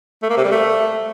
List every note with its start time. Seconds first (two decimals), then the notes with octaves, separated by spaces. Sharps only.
0.23 A3
0.30 A#3
0.37 C3
0.44 G3
0.52 A3